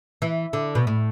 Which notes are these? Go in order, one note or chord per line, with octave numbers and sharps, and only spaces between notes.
E3
D3
B2
A2